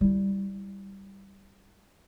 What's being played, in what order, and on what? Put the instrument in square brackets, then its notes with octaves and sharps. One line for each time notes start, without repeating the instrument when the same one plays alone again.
[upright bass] G3 E4